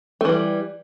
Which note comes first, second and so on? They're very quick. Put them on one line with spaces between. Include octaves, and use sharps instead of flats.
A3 E3 G3